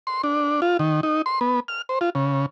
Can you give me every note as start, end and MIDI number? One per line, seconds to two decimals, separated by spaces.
0.07 0.22 84
0.24 0.61 62
0.62 0.77 65
0.79 1.01 51
1.03 1.22 63
1.26 1.40 84
1.41 1.60 59
1.68 1.82 89
1.89 1.99 72
2.01 2.10 65
2.15 2.46 49